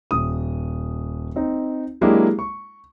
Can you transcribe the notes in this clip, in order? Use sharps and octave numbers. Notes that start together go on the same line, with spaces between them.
D#1 D#6
C4 D#4
F#3 G#3 A#3 D4 E4 G4
C#6